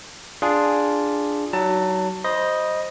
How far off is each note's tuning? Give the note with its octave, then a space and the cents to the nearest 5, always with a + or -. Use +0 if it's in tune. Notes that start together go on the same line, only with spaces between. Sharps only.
D4 +0 F4 +0 G#4 +0
F#3 +25 D#4 +10 A5 +25
C5 +0 D#5 +0 B5 -30